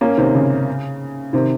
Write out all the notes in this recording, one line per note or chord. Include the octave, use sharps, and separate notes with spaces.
A#3 C#4
C3 D#3
C#3
C3 D#3